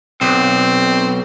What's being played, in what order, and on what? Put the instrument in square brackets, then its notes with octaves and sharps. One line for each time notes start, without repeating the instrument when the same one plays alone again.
[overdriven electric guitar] B1 [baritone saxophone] C4